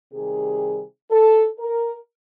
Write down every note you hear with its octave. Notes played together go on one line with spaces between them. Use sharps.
C3 D#3 G3 G#4
A4
A#4